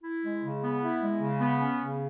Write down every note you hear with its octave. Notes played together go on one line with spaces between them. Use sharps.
E4
G#3
C#3
B3
E4
G#3
C#3
B3
C#4
C#3